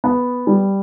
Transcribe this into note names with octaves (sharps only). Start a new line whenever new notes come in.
B3
G3